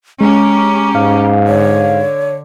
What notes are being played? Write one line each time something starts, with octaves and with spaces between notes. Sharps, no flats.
G#3 C#4 G4 A#5
G#2 F5
D3 C#5